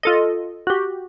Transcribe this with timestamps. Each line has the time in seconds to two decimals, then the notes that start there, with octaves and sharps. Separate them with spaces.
0.03 F4 A4 D#5
0.67 F#4 G4